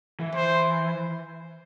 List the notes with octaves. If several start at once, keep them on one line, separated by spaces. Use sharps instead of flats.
E3
C5